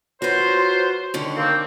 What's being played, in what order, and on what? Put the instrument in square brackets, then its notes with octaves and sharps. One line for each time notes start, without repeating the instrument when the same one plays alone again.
[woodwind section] F#3 F4 C5 [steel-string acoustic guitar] F#4 B4
[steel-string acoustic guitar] D3 D#3 C#4
[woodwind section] A#3 C4